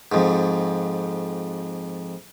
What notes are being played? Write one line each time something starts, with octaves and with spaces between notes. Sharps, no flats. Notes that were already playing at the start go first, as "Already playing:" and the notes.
F2 G#2